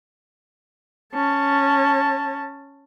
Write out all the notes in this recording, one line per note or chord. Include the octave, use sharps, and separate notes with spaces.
C#4 A5